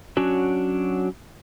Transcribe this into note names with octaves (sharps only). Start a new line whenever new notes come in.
F#3 C#4 D4 F#4 C#5